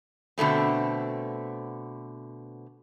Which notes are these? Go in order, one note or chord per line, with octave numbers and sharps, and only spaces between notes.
B2 D3 A3 C4